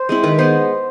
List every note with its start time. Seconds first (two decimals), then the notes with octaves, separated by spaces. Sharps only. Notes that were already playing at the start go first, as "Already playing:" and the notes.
Already playing: C5
0.09 G#3 C4 E4
0.24 D#3 B4
0.39 G#3 B3 C5